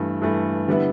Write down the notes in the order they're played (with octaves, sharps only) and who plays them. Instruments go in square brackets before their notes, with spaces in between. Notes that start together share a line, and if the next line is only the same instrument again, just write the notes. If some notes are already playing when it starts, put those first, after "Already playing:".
Already playing: [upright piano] G2 E3 A3
G2 E3 A3
D3 G3 B3 E4 B4